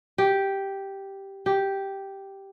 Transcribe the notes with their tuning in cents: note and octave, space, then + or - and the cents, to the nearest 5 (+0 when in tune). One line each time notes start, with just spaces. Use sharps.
G4 -5
G4 -5